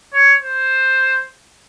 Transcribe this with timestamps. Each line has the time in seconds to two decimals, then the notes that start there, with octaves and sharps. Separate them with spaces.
0.13 C#5
0.42 C5